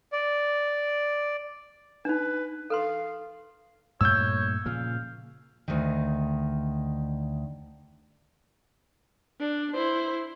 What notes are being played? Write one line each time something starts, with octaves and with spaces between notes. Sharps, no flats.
D5
D4 D#4 B4
A4 B4 F5 C6
G2 A#2 A3 C#5 E6 G6
A#2 C#3 F3 F5
D2 D#3
D4
E4 C5